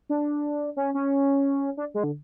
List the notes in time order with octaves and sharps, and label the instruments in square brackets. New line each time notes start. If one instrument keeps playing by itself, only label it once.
[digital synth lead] D4
C#4
C#4
D4
G#3
D3